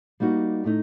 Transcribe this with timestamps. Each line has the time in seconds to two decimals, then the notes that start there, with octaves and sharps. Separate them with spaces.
0.20 G3 A#3 D#4 F#4
0.64 A2 A3 D#4